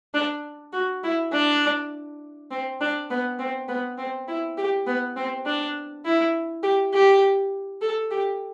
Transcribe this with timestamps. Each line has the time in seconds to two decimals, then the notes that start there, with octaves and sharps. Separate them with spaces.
0.14 D4
0.73 F#4
1.04 E4
1.32 D4
2.51 C4
2.81 D4
3.10 B3
3.39 C4
3.68 B3
3.98 C4
4.28 E4
4.57 G4
4.87 B3
5.17 C4
5.46 D4
6.05 E4
6.63 G4
6.94 G4
7.82 A4
8.11 G4